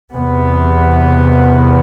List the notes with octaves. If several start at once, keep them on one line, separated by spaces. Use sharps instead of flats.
E2 C3 B3